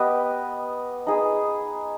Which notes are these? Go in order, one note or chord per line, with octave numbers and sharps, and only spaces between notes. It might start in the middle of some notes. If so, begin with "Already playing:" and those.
Already playing: B3 G4 B4 D#5
D#4 G#4 B4